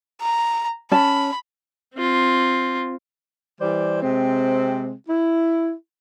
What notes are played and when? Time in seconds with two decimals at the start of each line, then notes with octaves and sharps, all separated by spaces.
0.21 A#5
0.92 C#4 A5 B5
1.95 C4 F4
3.60 E3 G3 C5 D5
4.02 C3 G#3 C4
5.07 E4